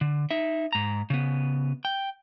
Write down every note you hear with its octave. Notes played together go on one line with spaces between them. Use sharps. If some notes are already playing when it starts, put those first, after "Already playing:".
D3
D#4 E5
G#2 A#5
C#3 B3
G5